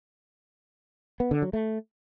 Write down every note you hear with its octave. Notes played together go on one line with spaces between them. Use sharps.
B3
D3
F#3
A3